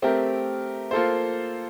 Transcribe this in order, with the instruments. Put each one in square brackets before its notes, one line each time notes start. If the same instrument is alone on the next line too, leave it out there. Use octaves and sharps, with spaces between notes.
[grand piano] A3 C4 G4 A#4
A#3 F4 A4 C5